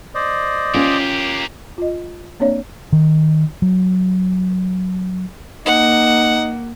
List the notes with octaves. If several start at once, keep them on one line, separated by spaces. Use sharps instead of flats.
C5 D5 D#5
A#3 C#4 F4 G4
F4 D#5
A#3 C4 D4 C#5 D5 F5
D#3
F#3
A#3 D#4 F#5